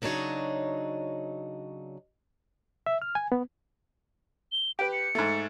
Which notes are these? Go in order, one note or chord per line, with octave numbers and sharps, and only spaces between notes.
C#3 F#3 D4 D#4 C#5
E5
F6
G#5
B3
G7
G4 B4 D7
C#7
G#2 A3